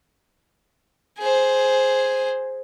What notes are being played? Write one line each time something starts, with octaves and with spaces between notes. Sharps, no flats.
G#4 C5